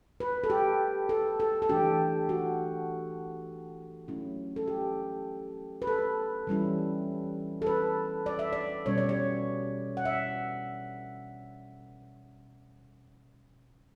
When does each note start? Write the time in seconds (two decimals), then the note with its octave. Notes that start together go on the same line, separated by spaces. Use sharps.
0.20 B4
0.44 A4
0.50 G4
1.09 A4
1.40 A4
1.62 A4
1.69 E3 A3 D4 G4
2.29 F#4
4.08 F#3 A3 C#4 E4
4.56 A4
4.68 G4
5.82 B4
5.87 A4
6.47 E3 G3 C#4 E4
7.62 A4
7.67 B4
8.26 D5
8.39 E5
8.53 D5
8.86 B2 G3 C#4 C#5
8.98 D5
9.09 C#5
9.97 F#5
10.05 E5